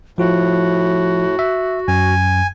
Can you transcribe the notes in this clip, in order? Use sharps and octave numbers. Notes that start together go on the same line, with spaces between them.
A2 F3 F4 F#4
E5
F#2 G#5